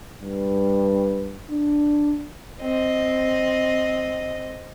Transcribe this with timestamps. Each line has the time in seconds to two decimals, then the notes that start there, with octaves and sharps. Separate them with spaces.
0.21 G2
1.51 D4
2.61 C4 D#5